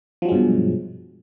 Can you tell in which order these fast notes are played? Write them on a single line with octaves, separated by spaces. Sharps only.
F3 F#3 G#3 G2 B2